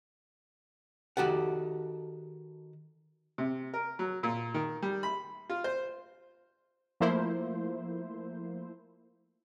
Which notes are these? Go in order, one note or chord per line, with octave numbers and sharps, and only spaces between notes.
D#3 F#4 G4 A4 F#5
C3
A#4
F#3
A#2
D#3
G3
B5
F4
C5
F3 A3 A#3 E4 C5